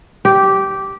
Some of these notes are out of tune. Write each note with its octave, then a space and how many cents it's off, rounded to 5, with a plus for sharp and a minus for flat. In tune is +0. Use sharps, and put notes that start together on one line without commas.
G4 -10